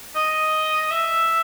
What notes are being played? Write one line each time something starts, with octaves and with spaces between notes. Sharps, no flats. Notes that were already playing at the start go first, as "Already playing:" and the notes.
D#5
E5